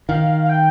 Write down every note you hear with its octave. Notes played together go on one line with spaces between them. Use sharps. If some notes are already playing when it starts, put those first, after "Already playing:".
D#3 F5
F5
G5